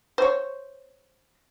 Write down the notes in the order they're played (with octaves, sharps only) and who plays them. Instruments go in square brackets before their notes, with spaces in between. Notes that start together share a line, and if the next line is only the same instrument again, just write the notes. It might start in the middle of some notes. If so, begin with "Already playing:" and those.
[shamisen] C5 C#5